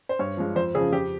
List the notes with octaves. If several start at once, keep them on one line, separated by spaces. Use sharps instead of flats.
C5
G2 C#5
F3 G#3
F2 C5
C#3 F3 G#4
F2 G4